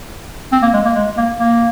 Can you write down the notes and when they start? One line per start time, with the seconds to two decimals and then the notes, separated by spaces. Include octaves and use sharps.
0.52 C4
0.62 A#3
0.74 G#3
0.85 A#3
0.95 G#3
1.17 A#3
1.40 A#3